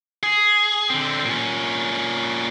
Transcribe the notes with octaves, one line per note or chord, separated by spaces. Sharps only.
G#4
D3 C4
A#2 C#4